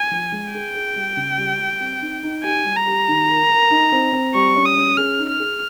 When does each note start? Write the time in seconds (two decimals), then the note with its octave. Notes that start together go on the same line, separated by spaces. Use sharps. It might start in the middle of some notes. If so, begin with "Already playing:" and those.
Already playing: G#5
0.11 F3
0.32 G#3
0.54 G#4 G5
0.75 G#4
0.96 G3
1.17 C#3
1.38 G3
1.59 G3
1.80 C4
2.01 D#4
2.23 D#4
2.44 G4 G#5
2.65 G3
2.76 A#5
2.87 G4
3.08 D#3
3.29 A#4
3.50 A#4
3.70 D#4
3.92 C4
4.13 C4
4.35 G3 C#6
4.56 C#4
4.66 D#6
4.77 C#4
4.97 G#4 F6
5.19 D#4
5.29 F6
5.40 G#4